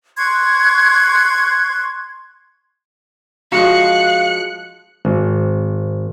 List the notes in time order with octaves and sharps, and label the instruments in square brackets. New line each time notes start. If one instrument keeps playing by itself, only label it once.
[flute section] C6 C#6 F#6 G#6
[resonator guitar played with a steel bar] F3 G#3 F#4 [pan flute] F5 [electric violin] F#6 C#7
[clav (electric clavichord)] G#1